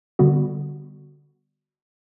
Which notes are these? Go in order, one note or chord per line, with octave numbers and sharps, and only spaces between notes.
D3 G3 B3 F#4